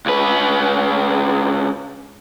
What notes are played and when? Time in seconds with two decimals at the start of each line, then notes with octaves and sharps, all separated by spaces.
0.06 C#2 B4